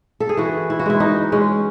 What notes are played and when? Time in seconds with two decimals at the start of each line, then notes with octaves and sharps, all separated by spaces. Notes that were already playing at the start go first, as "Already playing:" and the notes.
0.20 A4
0.29 G#4
0.37 E3 F#4
0.70 E4
0.80 F#4
0.86 G#3 E4
1.00 D#4
1.32 G#3 C#4